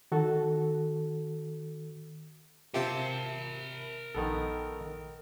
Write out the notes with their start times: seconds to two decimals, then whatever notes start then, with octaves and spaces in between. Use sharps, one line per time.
0.12 D#3 F#4 A4
2.74 C3 C4 F4 G4 A#4 E5 A5
4.15 A#1 D#3 B3 A4